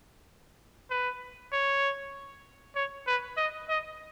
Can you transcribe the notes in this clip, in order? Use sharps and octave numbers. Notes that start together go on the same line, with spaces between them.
B4
C#5
C#5
B4
D#5
D#5